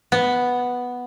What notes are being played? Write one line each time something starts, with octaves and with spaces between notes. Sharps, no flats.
B3